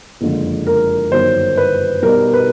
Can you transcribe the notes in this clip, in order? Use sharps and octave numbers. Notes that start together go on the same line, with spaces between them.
F#1 F2 D3 F3 G#3
A#4
G1 F#2 D#3 F#3 C5
B4
B1 B2 G3 A#4
B4